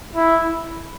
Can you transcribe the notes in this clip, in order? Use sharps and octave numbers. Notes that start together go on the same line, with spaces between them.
E4